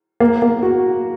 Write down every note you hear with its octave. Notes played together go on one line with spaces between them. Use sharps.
A#3
A#3
F#4